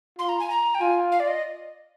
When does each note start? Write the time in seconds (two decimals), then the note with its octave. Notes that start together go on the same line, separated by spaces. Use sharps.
0.19 F4 C6
0.29 A#5
0.39 G#5
0.50 A#5
0.75 G5
0.81 F4 G#5
1.12 F5
1.20 D5
1.28 D#5